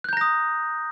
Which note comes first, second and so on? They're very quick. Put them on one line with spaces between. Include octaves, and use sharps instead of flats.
F#6 G6 A#5 A#6 D#6